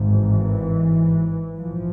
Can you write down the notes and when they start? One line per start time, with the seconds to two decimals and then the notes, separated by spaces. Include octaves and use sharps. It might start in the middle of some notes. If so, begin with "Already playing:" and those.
Already playing: G#1 G#2
0.09 E3
1.58 A#1 G#2 F3